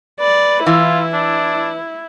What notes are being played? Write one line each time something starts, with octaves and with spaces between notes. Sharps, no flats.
B4 D5
E3 E4 F4
D4